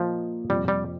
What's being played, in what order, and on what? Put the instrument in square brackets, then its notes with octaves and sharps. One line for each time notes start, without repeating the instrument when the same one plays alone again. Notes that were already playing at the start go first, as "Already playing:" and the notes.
Already playing: [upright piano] A#2 A#3 D#5 [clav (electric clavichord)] F3
[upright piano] F2 C3 F3 [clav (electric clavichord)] G3
[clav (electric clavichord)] G3